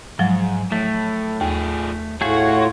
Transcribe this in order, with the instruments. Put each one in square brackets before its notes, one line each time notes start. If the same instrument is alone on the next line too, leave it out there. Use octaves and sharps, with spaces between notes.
[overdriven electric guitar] G#2 [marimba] F3 F#3
[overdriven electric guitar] A2 [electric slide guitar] A3
[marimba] D#2 [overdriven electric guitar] F3 G#4
[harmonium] A2 F4 C#5 [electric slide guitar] A3 G#4 [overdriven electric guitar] F#4